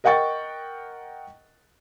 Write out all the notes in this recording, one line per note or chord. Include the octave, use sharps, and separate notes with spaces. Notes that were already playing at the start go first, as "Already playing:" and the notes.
A#4 D#5 F#5 G5 C#6 A6